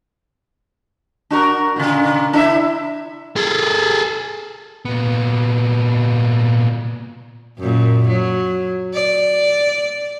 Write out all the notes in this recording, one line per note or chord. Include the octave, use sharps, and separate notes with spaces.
D4 F#4 A#4
A#2 C#3
D4 E4 E5
G#4 A4
A#2 B3
F#2 A#2
F#3
D5